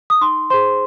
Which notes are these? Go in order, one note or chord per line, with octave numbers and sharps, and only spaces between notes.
D#6
D#4 C6
G#4 C5 C6